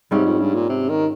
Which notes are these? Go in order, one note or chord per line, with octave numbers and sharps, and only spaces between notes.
G#2 C3 G3 C#4
F2
G2
A#2
C3
D#3